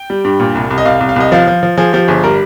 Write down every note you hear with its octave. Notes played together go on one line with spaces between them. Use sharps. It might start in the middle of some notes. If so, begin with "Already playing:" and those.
Already playing: G5
G3
G2
A#2
C2
C2
D#5
C2 F5
C2
F5
C2 D#5
F3 F5
F3
F3
F3 G#4
F3 G4
G1 G#4
G3 A#4